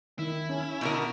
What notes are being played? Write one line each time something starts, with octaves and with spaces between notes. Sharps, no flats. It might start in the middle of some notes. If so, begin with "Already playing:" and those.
D#3 E4
C#4
B2 D3 A#4